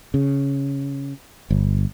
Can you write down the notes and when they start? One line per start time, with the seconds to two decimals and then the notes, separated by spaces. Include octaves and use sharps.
0.14 C#3
1.50 G1